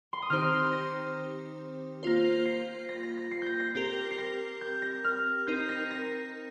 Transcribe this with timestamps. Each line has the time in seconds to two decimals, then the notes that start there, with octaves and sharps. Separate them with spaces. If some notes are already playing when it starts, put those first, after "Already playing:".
0.13 C6
0.22 D#6
0.30 D#3 C4 D#4 G4 C5 F6
0.73 A#6
2.03 A#3 F4 C5
2.45 C7
2.89 A#6
3.03 A#6
3.18 A#6
3.31 C7
3.42 G6 A#6
3.60 A#6
3.75 C4 G4 A#4 C7
4.11 C7
4.18 A#6
4.61 G6
4.82 A#6
5.04 F6
5.47 C4 D#4 A#4 G6
5.69 A#6
5.91 A#6